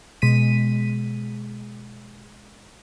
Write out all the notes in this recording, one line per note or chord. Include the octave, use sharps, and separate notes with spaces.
B2 G#3 B6 D#7